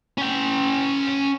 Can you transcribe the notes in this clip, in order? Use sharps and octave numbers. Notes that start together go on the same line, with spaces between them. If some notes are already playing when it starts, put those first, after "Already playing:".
C#4 G5